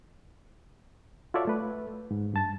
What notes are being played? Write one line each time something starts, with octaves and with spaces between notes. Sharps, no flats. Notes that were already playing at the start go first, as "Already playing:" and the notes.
F4 F#4 A4 C#5 D5 E5
A3 B4
G#2
G2 A5 A6